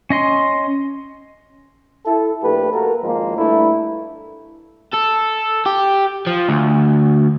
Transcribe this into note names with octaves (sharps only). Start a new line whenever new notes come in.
C#4 D#5 C6
E4 A4
A#1 A3 G4 B4
A#3 F#4 A4 A#4
G#1 F3 G#3 A#3
G2 A3 D4 E4
A4
G4
F3
D2